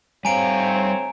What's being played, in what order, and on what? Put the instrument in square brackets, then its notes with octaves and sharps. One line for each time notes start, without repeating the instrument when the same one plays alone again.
[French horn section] D2 C4 C#5 [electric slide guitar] G3 F5 [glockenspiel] G#5 A#5 D7